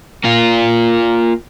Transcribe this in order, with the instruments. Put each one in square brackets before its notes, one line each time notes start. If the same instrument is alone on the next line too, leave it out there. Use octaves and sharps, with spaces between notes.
[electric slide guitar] A#3 F4